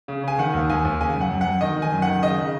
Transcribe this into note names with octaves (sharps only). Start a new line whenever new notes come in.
C#3
C#3 G#5
D#3 F#5
D#2
D#2 G#5
D#2
C#3 G#5
F#2
F#5
F#2
F#5
F#2
D#3 D#5
D#3
G#5
F#2
F#5
D#3
C#3 D#5
C#3